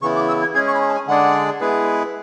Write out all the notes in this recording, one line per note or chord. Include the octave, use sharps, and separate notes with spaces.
C#3 E3 B3 E4 C#6
D6
E6
G#6
G#3 C#4 G#4 G#6
C#6
B5
C#6
A5
G#5
D3 G#3 D4 G#4 D5 F#5
G#3 B3 E4 G#4 B4